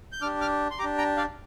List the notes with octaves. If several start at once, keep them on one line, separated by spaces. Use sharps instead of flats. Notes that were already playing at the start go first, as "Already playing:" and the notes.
G6
D4 G4 D6 F6
D6 F6
C6
D4 G4 A#5 D6
G5 A#5
D5 F5